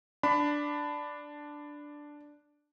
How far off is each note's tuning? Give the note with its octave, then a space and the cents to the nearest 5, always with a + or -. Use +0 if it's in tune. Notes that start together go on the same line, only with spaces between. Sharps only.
D4 +0 B5 +20